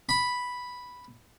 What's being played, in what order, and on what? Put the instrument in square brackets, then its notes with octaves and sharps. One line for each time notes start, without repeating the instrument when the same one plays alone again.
[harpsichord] B5